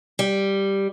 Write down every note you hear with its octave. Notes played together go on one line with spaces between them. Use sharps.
G3